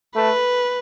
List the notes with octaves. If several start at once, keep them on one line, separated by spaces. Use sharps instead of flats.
A3 B4